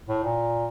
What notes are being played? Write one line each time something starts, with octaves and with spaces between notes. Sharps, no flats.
A2
A#2